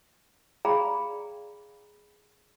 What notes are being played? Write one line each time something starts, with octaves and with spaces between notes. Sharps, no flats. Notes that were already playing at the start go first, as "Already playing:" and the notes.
G#4 D5 F5 G5 A#5 B5